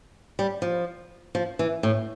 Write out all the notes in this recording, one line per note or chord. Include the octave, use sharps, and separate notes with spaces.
G3
F3
F3
E3
A2